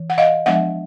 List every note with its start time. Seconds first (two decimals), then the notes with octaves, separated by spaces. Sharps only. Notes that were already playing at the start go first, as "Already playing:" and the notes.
Already playing: E3
0.10 F#5
0.18 D#5 F5
0.46 F3 G#3 B3 D4 E5 F#5